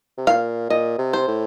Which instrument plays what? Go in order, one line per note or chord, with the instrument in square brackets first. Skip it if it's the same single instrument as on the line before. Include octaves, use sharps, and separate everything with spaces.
[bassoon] C3
[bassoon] A#2 [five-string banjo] F5
[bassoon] A#2 [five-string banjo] D#5
[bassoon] C3
[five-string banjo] C5
[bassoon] A2